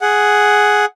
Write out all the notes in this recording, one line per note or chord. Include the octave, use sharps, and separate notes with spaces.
G#4 F#5